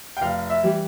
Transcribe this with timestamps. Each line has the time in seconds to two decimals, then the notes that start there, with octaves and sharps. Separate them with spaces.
0.17 G5
0.21 F1 F5
0.50 E5
0.63 E3 G3